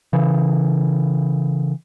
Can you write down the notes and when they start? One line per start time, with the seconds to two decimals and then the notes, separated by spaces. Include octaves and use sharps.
0.13 C#3 E3